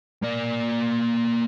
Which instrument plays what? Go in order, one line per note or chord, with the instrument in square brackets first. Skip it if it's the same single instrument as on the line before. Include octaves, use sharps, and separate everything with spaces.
[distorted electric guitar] A#3 D5